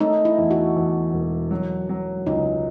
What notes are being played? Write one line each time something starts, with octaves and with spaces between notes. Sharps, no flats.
A3 D#4
E4
E2
F#4
E2
E1
F#3
F#3
C#2 D#4